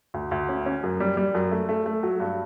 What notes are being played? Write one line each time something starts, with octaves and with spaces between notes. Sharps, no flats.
D2
D2
C#4
C#4
F#2
G3
G3
F#2
A3
A3
A3
F#3
G2